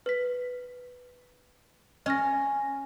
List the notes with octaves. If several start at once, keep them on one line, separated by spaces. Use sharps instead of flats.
B4 B6
C#4 D#5 F6 A#6